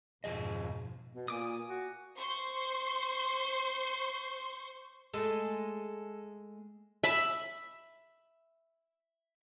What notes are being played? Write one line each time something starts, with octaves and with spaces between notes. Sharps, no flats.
F2 G#2 B2 G#4 D#5
B2
A#2 G#5 D6 D#6
F#4
C5 C6 C#6
G#3 A3 A4
E5 B5